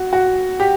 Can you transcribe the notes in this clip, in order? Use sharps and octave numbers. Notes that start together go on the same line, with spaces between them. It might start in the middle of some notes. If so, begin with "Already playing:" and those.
Already playing: F#4
F#4
G4